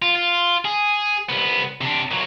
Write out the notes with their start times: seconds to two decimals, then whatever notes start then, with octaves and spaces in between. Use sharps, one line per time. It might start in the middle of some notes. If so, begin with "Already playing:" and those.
0.02 F4
0.16 F4
0.65 G#4
1.29 C2 B3
1.81 C3 D4
2.11 A#2 F#3